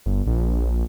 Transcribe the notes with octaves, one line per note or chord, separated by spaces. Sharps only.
G1
A#1